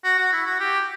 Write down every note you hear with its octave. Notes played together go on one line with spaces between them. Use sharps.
F#4
F#4
E4
F#4
G4